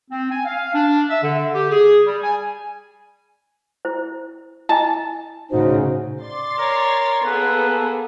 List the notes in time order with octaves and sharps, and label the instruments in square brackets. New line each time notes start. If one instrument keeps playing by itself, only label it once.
[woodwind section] C4
G#5
F5
D4
E5
D3
G4
G#4
G3
G#5
[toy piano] E4 C5
[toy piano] E4 D#5 G#5 [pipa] A5
[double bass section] A2 C#3 [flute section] D#4 F#4 C5
[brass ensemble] D5 [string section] C6 A6
[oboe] A#4 [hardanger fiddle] C#5
[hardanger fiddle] A#3 [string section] B3 G#4 [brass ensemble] A4 [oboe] B4